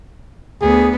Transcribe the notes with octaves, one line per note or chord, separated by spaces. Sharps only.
D2 B3 G#4